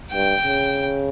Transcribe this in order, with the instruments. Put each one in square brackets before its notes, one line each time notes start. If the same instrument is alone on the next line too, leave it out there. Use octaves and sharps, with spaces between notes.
[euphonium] G2 [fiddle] G5
[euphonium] C#3